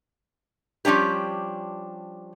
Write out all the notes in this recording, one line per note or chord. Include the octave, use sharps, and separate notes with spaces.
F3 G3 C#4 D4 G4